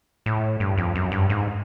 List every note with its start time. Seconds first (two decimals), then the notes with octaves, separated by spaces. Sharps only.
0.26 A2
0.60 G2
0.77 F2
0.95 F#2
1.12 G2
1.30 G#2